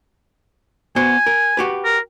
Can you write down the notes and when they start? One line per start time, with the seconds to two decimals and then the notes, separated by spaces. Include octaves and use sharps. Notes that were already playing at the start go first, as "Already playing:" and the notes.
0.96 B3 F#4 C5 G#5
1.26 A#4
1.57 F#4 G4 B4
1.84 A#4